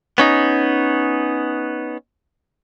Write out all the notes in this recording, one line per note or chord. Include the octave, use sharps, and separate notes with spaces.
B3 C#4 D#4